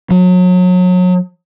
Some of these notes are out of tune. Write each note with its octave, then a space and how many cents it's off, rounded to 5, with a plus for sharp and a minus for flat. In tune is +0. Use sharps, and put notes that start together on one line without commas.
F#3 -30